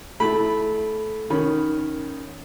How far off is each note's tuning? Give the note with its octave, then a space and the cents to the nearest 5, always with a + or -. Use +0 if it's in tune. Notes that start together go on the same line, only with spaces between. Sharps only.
A3 -20 E4 +0 B5 +0
D#3 +0 C#4 +0 B5 +0